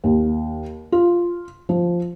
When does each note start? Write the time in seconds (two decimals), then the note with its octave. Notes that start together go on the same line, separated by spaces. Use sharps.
0.04 D#2
0.92 F4
1.69 F3